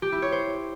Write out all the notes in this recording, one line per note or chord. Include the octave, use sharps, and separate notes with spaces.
G4
E4
C#5
C5